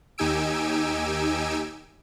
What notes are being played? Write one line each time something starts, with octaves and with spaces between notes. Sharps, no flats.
D#2 D#4 G4 G#5 E6 D7